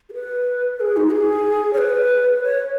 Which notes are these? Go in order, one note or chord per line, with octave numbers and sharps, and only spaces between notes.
G#4
B4
G#4
D#4
G#4
C#5
B4
C#5